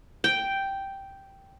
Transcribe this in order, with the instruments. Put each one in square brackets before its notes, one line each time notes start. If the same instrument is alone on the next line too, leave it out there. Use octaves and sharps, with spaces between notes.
[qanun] G5